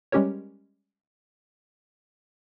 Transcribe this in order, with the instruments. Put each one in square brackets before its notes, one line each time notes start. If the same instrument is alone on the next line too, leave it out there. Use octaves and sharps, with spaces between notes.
[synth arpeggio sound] G3 G#3 C#4 G4 A#4 C#5